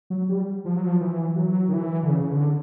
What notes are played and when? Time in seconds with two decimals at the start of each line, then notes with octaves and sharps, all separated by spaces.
0.10 F#3
0.29 G3
0.65 F3
0.76 F#3
0.86 F3
1.01 E3
1.36 F#3
1.69 D#3
1.73 E3
2.03 D3
2.08 C#3
2.21 C#3
2.32 D3